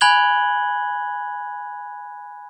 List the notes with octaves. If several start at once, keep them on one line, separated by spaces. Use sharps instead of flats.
G#5 B5 F#6 G#6 F#7 G7